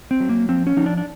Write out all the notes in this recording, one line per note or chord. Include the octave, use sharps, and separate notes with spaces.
C4
F#3
A#3
F3 C4
C#4
F3 D#4
D4
D4